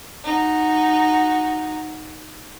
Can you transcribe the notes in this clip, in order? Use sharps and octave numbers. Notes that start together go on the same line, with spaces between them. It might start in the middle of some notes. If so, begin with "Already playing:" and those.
D#4 F#4